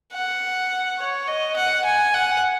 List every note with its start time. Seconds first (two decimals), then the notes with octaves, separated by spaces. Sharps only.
0.13 F#5
0.98 C#5
1.28 D#5
1.56 F#5
1.85 G#5
2.14 F#5